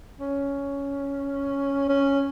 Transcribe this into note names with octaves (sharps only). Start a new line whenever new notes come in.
C#4
C#4